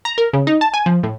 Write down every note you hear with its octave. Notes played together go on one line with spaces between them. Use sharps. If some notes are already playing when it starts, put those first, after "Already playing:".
A#5
A#4
C#3
D#4
A5
G#5
F3
A2